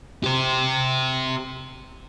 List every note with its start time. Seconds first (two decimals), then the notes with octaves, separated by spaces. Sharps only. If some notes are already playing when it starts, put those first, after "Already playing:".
0.24 G4 C5